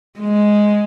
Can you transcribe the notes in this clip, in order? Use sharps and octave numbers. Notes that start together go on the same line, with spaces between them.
G#3